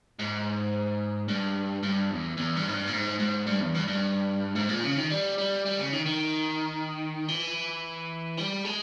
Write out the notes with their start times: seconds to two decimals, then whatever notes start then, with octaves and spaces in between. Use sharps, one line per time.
0.19 G#2
1.28 G2
1.83 G2
2.11 E2
2.37 E2
2.56 G2
2.68 G#2
2.73 G2
2.87 A#2
2.93 G#2
3.20 G#2
3.46 G2
3.60 E2
3.75 G2
3.87 G2
4.55 G#2
4.69 A#2
4.84 C#3
4.97 D#3
5.10 G3
5.38 G3
5.65 G3
5.79 C#3
5.93 D#3
6.05 D#3
7.28 E3
8.37 G3
8.64 G#3